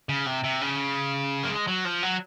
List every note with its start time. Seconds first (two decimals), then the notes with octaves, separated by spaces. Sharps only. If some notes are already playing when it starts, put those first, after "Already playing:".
0.09 C#3
0.26 C3
0.44 C3
0.61 C#3
1.43 A#3
1.49 G#3
1.67 F#3
1.85 F3
2.03 F#3